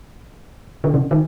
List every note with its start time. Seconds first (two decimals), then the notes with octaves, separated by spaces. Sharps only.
0.84 D3
0.94 C#3
1.11 D#3